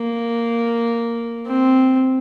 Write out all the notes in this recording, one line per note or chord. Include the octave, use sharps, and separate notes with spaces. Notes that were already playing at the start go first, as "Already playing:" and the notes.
Already playing: A#3
C4